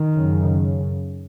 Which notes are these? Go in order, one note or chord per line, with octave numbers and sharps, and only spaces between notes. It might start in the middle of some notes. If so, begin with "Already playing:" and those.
Already playing: D#3
F#2 C#3